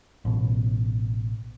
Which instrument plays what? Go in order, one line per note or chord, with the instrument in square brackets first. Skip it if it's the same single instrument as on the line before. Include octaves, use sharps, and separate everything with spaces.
[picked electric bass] A1 B2